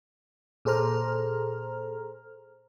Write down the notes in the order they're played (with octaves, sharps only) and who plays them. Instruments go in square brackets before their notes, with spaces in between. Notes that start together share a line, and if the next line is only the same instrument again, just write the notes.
[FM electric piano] A#2 G#4 A4 C5 A#5 F6